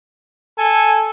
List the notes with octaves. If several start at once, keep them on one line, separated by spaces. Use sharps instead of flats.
A4 G#5